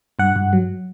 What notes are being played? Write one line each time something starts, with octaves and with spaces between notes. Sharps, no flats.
G2 F#5
G2
F#3